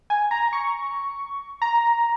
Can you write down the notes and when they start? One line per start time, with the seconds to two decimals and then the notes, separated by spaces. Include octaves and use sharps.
0.10 G#5
0.31 A#5
0.53 C#6
1.62 A#5